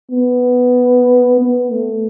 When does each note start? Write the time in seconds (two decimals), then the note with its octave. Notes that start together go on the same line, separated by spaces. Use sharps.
0.11 B3
1.40 B3
1.72 A3